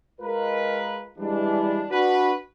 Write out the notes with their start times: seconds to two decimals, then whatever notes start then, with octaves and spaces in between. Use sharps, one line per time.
0.21 G#3 F4 A#4 B4
1.18 E3 G3 G#3 D4
1.90 D4 F#4 B4